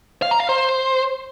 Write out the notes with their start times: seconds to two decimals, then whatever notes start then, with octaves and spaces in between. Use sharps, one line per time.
0.22 F5
0.31 A#5
0.40 F5
0.49 C5